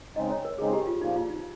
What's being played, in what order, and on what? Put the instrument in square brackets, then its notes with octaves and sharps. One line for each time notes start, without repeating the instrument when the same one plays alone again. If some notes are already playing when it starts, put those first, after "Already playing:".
[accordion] C#3 G#3 C4 D#4 [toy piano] D#5
[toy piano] C#5
A#4
[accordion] C#3 G#3 C4 D#4 [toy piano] G#4
[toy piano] G4
F4
[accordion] A#2 F3 A#3 [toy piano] D#4
[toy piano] F4
D#4